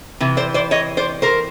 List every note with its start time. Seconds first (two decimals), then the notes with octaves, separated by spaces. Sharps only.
0.20 C3 E3
0.37 C5 D5
0.54 C5 D5
0.71 C#5 D#5
0.97 C5 D5
1.22 A#4 C5